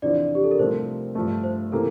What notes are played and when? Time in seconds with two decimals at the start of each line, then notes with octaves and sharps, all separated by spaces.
0.02 E2 C3 F3 C4 D4 F4 D5
0.35 G4
0.44 A4
0.51 A#4
0.59 C2 C3 F3 A3 C4 C5
1.15 G2 F3 A3
1.43 C5
1.72 C3 E3 A#3 A4